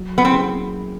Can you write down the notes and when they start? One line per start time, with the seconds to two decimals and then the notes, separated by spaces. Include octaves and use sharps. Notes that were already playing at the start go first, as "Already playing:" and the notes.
Already playing: F#3
0.18 B3
0.25 A#3 C4 C#4 E4 G#4